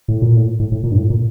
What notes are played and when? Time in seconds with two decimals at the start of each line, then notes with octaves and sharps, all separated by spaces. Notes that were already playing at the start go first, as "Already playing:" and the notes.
0.08 A2
0.22 A#2
0.36 A2
0.60 A2
0.72 A2
0.84 A#2
0.92 G2
0.97 A2
1.10 A#2